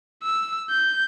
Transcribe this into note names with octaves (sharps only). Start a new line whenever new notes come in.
E6
G6